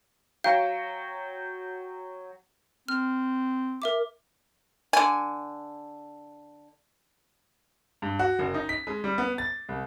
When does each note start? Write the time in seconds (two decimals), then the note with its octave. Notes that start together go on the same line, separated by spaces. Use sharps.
0.44 F#3 F5 G5
2.88 C4 F6
3.82 A#4 E5 D6
4.93 D3 G#5
8.02 G2
8.19 F#4
8.39 F#1
8.54 D#4
8.69 B6
8.87 G#3
9.04 G3
9.18 B3
9.38 A6
9.69 C2